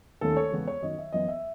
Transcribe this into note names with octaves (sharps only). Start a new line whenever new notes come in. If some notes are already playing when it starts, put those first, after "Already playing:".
D#2 D#3 A3 C#4 A4
C#5
E2 C#3 G#3 B3
C#5
F#2 D#3 F#3 D#5
E5
F#2 E3 B3 D#5
E5